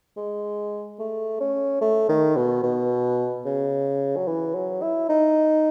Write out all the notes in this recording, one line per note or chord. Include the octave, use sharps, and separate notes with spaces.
G#3
A3
C#4
A3
D#3
B2
B2
C#3
F#3
E3
F#3
E4
D#4